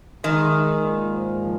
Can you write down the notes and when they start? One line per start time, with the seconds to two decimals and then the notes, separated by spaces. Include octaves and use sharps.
0.23 D#3 G#3
0.54 G#3
0.83 A#2
1.13 G#2
1.42 F3